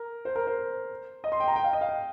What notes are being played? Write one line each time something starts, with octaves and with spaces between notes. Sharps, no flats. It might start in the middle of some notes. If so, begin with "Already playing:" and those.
Already playing: A#4
C5
A#4
C5
D#5
C6
G5
A#5
G5
F5
D#5
F5
G5